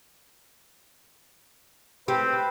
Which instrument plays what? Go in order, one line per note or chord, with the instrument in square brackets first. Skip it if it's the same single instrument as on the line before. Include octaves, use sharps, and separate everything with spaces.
[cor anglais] C4 [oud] G4 [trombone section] B4